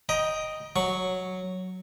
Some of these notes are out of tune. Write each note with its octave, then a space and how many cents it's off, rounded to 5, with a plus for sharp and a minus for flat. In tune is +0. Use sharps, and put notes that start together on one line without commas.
D#5 +0 G5 +0 A#5 +35
F#3 +0 C#6 +0